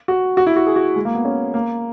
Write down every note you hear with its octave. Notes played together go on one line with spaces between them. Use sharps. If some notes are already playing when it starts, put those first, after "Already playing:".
F#4
F#4
E4
F#4
G#4
F#4
G#3
A#3
B3
C#4
A#3